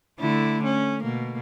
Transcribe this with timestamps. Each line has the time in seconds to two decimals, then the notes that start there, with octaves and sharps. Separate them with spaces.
0.20 D3 A3 E4
0.64 C#4
1.03 B2 A#3